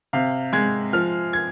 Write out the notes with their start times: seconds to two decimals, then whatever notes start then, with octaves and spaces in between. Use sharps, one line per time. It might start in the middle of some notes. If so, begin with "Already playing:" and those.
0.13 C3 F5
0.53 G#3 G#6
0.93 F3 F6
1.33 G#6